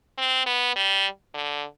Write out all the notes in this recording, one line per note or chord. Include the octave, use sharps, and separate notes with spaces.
C4
B3
G3
D3